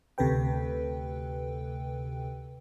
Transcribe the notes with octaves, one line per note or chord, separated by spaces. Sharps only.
D2 C3 A4 B4 G5